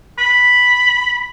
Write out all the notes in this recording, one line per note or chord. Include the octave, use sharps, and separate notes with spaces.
B5